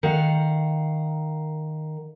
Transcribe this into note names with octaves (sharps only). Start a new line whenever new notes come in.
D#3 F5 F#5